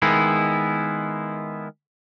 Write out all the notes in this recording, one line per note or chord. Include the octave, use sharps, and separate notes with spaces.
D#3 G#3 B3 E4